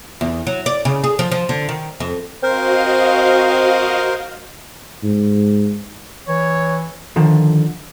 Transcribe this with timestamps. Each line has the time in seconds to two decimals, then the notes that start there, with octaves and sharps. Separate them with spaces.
0.21 E2
0.47 F#3
0.66 D5
0.85 C#3
1.04 G#4
1.19 F3
1.32 F3
1.49 D3
1.69 D#3
2.00 F2
2.43 C4 F#4 A#4 C5 D#5 F5
5.03 G#2
6.28 E3 C#5
7.16 D3 D#3 F3